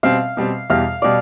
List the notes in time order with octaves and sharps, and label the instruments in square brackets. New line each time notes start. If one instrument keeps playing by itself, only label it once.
[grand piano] B2 G3 C4 [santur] F5
[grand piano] B2 G3 C4
[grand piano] E2 B2 G3 [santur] F5
[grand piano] B2 G3 [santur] D5